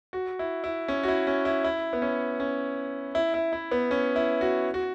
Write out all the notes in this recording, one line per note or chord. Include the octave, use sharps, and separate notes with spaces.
F#4
E4
E4
C#4
F#4
E4
C#4
E4
E4
B3
C#4
C#4
E4
E4
E4
B3
C#4
E4
F#4
F#4